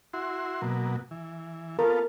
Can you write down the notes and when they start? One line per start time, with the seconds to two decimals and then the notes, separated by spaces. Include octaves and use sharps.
0.13 E4 F#4 C6
0.62 B2 F#3 A#3
1.11 E3
1.79 B3 F4 A4 A#4